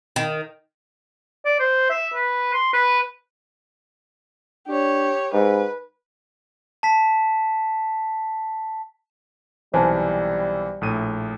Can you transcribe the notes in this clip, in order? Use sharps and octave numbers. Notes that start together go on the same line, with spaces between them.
D#3
D5
C5
E5
B4
C6
B4
D4 G4 C#5
G#2 B4
A5 B6
B1 C3 E3 G3 C5 G#5 A5
A#1 A2 D#7